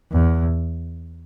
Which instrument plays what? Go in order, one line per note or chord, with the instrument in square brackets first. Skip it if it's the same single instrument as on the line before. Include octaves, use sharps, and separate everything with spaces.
[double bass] E2